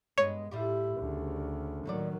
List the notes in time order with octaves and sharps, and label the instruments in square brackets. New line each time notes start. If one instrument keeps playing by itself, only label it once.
[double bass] G2 [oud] G#3 B3 B4 [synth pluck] C#5
[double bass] A2 E4 [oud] G3 F4 G4
[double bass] D2 C#3
[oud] D#2 A2 D5 [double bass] D#3 F#3